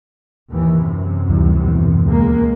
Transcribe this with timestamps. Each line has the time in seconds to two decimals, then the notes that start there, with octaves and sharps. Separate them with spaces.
0.51 D#2 E3
0.84 F#2 C3
1.29 D2 E3 G3
1.64 D#2 B2 E3
2.05 C#2 G#3 A#3